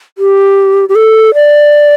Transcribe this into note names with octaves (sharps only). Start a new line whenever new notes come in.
G4
G4
A4
D5